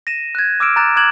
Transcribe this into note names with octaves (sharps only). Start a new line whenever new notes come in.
A#6 D#7 E7
F#6 G#6
D6 E6 F6 D7 E7
A#5 D6 F#6 A6 E7
D6 F#6 G#6 E7 F#7